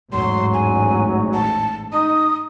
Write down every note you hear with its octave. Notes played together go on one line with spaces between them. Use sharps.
A1 E2 G#2 F#3 C6
G#5
A5
D#4 D#6